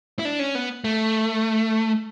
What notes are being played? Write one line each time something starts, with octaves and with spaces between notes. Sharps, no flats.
E4
D4
C#4
B3
A3